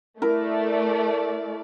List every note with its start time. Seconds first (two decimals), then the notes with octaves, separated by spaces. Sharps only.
0.22 A3 E4 A#4 D5